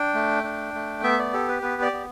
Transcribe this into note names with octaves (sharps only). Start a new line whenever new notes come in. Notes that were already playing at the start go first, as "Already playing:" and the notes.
Already playing: D4 G5
A3
D4
A3
B3 E5
D5
G4 A4
B4
B3 B4
D5
B3